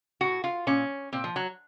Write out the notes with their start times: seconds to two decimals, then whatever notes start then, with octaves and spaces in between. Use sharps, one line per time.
0.21 A2 F#4
0.44 F4
0.67 A#2 C#4
1.13 A#2 C4
1.24 F3
1.36 F#3